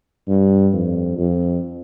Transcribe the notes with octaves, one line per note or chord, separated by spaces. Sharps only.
G2
F2
F2